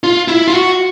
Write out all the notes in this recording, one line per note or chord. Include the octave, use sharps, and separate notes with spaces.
F4
E4
F4
F#4